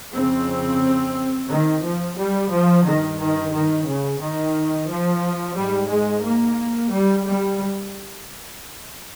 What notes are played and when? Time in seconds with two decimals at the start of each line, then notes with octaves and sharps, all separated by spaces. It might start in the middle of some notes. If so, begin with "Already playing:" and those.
0.13 F2 C#3 C4
1.49 D#3
1.83 F3
2.17 G3
2.51 F3
2.85 G2 D#3
3.18 D#3
3.52 D#3
3.86 C#3
4.20 D#3
4.88 F3
5.55 G#2 G3
5.89 G#3
6.23 A#3
6.91 G3
7.25 G3